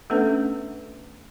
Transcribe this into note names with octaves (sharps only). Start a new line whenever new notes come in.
A3 B3 C#4 D4 A4 B4